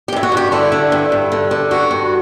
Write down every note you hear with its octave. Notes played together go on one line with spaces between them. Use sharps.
G4
G2 E4
F#4
G2 G4
D3 E4
D3
G2
G2
D3
D3
G2 F#4
G2